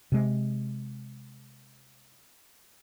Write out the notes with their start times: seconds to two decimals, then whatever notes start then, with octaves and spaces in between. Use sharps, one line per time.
0.12 C3 G#3